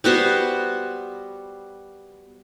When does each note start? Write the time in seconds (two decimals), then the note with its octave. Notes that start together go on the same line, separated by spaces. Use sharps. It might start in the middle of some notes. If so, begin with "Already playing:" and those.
0.04 G3 B3 F#4 C5